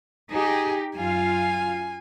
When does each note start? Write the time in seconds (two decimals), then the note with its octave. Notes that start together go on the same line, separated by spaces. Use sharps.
0.32 D#4 G4 G#4
0.97 F#2 F4 F5 G#5